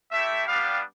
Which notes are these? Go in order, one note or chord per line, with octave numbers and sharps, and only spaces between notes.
A3 E4 G4 E5
G3 B3 D4 G4 F5